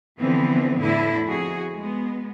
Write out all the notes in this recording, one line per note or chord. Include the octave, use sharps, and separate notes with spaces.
D3 E3 F3 B3 C4
E2 A2 D3 E4
F2 F#4 G#4
G#3 B3